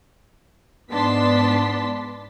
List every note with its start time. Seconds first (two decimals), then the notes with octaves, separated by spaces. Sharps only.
0.90 G#2 B3 D4 A5 C6 B6